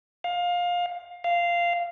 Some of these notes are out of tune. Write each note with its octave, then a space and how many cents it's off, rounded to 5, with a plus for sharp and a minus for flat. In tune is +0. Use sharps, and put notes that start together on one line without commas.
F5 +20
F5 -10